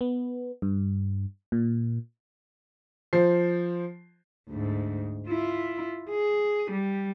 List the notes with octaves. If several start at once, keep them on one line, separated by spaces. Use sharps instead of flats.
B3
G2
A#2
F3 C5 C7
D2 G#2
E4 F4
G#4
G3